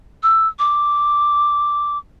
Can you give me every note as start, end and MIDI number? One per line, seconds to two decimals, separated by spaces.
0.23 0.47 88
0.59 1.98 86